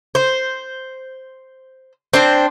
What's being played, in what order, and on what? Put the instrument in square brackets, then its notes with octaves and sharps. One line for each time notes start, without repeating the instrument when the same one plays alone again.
[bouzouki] C5
C4 D4 C5